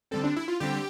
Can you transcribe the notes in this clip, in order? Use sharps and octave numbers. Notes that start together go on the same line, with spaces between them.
D3 G3 C4 A4
D4
E4
F4
D3 G3 C4 G4